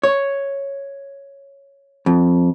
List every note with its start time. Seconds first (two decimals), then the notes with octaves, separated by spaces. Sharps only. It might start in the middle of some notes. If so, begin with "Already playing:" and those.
0.03 C#5
2.06 F2